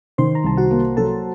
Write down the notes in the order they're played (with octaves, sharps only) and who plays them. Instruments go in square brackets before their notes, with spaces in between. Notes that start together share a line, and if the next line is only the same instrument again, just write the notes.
[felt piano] D#3 [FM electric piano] C5 C6
[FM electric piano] A#5
[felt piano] C2 [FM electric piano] A5
[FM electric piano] F#4 F#5
[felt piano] A#3
[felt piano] F#3 [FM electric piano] A4 A5